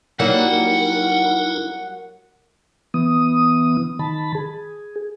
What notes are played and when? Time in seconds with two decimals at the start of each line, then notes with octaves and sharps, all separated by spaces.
0.20 F#3 G3 A#3 D#4 E4 A#4 F#5
2.94 E3 B3 D#6
3.99 D#3 A5 B5
4.35 G#4